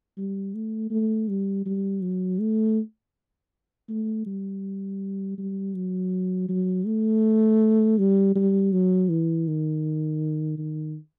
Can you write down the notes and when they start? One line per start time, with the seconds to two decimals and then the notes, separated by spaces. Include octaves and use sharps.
0.17 G3
0.54 A3
0.91 A3
1.29 G3
1.65 G3
2.02 F#3
2.40 A3
3.89 A3
4.26 G3
5.38 G3
5.74 F#3
6.49 F#3
6.86 A3
7.98 G3
8.35 G3
8.72 F#3
9.09 E3
9.47 D#3
10.58 D#3